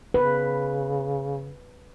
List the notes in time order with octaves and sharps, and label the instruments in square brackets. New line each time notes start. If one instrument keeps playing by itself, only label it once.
[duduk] C#3 [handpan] B4